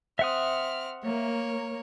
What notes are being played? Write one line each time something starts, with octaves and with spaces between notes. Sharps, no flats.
C4 E5 F#5 D#6 F6
A#3 A#4 C#5